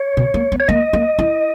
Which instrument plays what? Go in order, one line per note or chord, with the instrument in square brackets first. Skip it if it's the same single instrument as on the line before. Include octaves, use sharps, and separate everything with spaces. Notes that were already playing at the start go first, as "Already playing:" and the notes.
Already playing: [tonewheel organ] C#5
[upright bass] B2
A#3
B3
[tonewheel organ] C#5
[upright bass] A#3 [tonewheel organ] D#5
[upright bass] A#3
E4